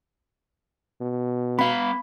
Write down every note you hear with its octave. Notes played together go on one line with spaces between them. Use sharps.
B2
B3 F5 B5